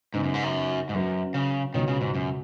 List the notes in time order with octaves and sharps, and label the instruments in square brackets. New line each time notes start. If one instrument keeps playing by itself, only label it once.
[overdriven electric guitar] G#2 [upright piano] C#3 B3 D#4 B4
[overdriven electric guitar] F#2
G#2
F#2
G#2
[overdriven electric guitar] F#2 [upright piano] F#3 C#4 B4
[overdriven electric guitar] C#3
[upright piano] C#2 B2 B3 F#4 C#5 [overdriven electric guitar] D#3
[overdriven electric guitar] C#3
G#2
F#2